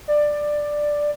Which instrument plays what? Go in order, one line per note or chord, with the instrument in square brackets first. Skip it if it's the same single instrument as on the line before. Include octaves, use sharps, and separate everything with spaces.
[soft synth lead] D5